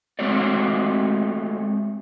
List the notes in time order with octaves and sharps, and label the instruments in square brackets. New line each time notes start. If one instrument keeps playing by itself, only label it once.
[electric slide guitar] G#3 A3 C4 F#4 C#5 D5